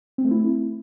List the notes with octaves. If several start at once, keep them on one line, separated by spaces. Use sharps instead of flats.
C4
A3
E4